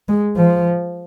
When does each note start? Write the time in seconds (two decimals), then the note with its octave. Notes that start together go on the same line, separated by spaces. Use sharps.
0.08 G#3
0.37 F3